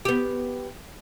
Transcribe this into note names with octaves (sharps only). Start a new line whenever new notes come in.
B3 G4